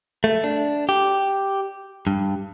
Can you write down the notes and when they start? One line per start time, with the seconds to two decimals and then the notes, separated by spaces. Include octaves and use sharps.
0.24 A3
0.44 D4
0.89 G4
2.07 G2